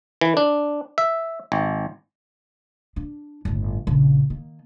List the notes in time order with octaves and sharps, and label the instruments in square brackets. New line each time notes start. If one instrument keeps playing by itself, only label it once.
[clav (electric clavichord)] E3
D4
E5
G#1
[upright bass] D4
G1 A2
A#1 C#3
D#3 A#3